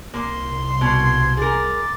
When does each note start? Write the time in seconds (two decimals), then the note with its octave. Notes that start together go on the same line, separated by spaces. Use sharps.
0.14 C2 A#3 C6
0.81 B2 G#6
1.37 G#4 A#4 D6 A6